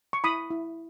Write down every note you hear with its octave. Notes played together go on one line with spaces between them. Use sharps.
C#6
E4 B5 D#6
E4